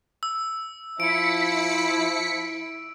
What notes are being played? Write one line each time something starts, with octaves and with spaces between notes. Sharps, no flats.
E6
F3 E4 B6 C#7 D7